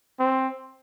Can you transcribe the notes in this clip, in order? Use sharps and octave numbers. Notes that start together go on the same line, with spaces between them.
C4